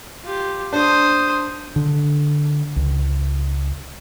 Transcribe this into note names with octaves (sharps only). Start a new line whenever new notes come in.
F4 G4
D4 C5 D#6
D3
C#2